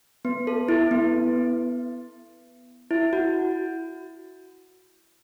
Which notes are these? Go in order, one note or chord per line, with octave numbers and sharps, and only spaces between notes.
B3
A4
E4
B3
E4
F#4